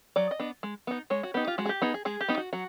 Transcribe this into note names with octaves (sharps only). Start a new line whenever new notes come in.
F#3 D5
D#5
B3 D4
G#3
B3 D#4
G#3 C#5
F#4
B3 D#4 G4
F4
G#3 F#4
G#4
G4
B3 D#4 G#4
G#4
G#3 G#4
G4
B3 D#4
F#4
F#3 F#4